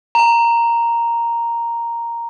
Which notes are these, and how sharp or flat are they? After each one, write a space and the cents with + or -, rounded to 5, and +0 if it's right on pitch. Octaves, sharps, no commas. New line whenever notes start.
A#5 +0